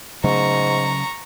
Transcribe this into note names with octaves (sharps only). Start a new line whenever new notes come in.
G#2 C#3 F#3 A3 A#5 C#6